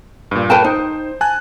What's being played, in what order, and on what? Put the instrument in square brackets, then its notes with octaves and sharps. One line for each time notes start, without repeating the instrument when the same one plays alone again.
[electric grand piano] G2 A#2
[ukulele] B4 G5 A5
[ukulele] D#4 [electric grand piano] C5
[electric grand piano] G#5 A5 F#6